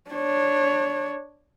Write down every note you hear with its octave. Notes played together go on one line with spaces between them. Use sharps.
D4 C#5